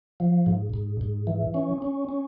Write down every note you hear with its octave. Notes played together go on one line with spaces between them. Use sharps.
F3
G#2
G#2
G#2
E3
C#4
C#4
C#4